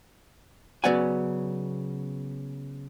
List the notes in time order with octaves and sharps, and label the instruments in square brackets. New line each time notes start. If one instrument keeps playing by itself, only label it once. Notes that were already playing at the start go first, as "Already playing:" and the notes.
[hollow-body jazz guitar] C#3 F#3 B3 D5 F#5 G#5